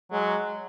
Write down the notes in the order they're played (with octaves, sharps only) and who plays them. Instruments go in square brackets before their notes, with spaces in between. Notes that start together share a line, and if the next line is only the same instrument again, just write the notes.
[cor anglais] F#3 [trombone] G#3